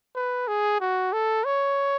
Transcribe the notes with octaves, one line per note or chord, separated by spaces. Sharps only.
B4
G#4
F#4
A4
C#5